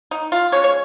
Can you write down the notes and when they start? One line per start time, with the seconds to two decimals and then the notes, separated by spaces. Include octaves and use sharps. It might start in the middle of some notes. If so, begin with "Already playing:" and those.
0.11 D#4
0.32 F4
0.52 F3 G#3 C#4 C#5
0.64 C#5